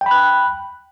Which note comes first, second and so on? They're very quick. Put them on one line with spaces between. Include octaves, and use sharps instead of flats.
G5 B5 F#6